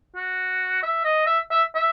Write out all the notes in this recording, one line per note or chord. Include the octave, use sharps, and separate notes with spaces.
F#4
E5
D#5
E5
E5
E5